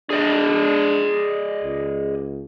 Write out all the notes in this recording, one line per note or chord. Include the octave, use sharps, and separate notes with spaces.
D4 G#4 D5 D#5
C#2